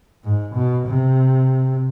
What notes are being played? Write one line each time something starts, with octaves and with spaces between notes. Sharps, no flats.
G#2
B2
C3